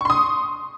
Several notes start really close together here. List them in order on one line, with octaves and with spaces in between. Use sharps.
C#6 C6 D#6